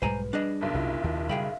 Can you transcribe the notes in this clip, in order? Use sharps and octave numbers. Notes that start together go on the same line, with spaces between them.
B1 G#2 G3 B4 C5 G#5 A#5
G3 D4 G#4 D#5
F#1 B1
C2 E4 F4 E5
D#2
C#3 G3 G#4 E5 F5 G5 B5